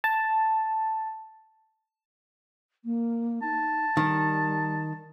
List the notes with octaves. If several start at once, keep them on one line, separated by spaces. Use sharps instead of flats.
A5
A#3
D#4 A5
D#3 G3